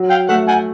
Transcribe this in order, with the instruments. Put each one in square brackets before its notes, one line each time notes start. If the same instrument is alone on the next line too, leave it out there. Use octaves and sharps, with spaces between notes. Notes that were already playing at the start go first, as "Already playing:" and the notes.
Already playing: [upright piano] F#3
[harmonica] F5 G5
[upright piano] A3 [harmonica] E5 F#5
[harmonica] F#5 G#5